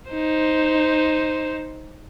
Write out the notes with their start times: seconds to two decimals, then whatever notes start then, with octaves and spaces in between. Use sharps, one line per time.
0.11 D#4 C5